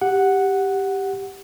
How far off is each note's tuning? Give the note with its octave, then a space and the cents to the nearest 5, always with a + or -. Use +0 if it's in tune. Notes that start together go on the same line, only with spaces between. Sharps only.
G4 +0 F#5 +0